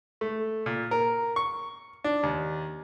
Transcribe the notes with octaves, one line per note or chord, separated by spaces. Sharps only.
A3
A#2
A#4
C#6
D4
D#2